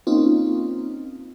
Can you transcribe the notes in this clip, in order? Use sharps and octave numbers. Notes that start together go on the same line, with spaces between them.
A#3 C4 C#4 D#4 F4